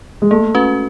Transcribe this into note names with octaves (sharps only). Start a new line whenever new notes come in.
G#3
A3 A#3
C#4 F#4 B4